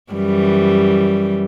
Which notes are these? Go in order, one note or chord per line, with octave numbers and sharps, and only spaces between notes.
F#2 E3 G3